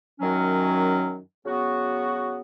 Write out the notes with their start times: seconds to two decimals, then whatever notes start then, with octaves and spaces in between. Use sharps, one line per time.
0.20 F#2 D#3 F#3 C#4
1.44 C#3 F#3 B3 F#4